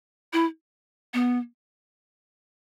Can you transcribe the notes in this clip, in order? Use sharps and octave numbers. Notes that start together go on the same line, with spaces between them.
E4
B3